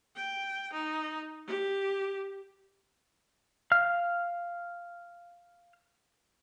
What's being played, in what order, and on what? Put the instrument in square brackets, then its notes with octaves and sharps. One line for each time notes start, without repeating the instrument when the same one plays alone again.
[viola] G5
D#4
G4
[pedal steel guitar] F5 F6